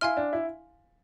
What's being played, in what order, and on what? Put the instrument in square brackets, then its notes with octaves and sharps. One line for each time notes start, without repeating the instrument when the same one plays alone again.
[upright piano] E4 [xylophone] F5 G#5 C6 F6
[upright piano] D4
E4